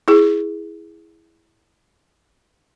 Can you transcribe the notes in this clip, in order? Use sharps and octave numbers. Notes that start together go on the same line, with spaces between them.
E4 G#4